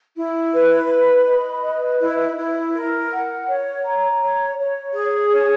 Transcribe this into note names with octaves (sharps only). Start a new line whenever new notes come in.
E4
B4
B5
D#5
B4
E4
E4
A#4
F#5
C#5
A#5
C#5
C#5
G#4
C#5